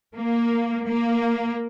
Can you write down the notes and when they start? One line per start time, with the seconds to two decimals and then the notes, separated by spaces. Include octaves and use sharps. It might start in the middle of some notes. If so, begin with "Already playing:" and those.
0.15 A#3
0.86 A#3